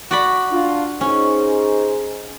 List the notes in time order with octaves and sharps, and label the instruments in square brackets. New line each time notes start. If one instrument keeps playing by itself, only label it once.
[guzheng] F#4 D5 B5
[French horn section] D4 F4
[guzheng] C#4 [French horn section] D#4 G#4 C5